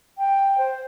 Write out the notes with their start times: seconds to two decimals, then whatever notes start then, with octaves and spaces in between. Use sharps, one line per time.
0.18 G5
0.58 C5